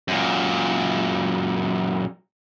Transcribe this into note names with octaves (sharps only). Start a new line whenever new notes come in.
F#2 A#2